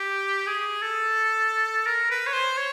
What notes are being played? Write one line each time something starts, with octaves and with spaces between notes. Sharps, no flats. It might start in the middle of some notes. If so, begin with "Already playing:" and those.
Already playing: G4
G#4
A4
A#4
B4
C#5
C5
C#5